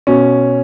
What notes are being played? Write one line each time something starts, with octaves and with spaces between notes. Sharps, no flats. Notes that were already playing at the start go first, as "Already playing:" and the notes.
B2 C#4